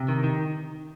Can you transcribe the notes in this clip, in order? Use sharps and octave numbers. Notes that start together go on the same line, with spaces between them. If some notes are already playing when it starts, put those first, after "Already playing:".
Already playing: C3
D#3
D#3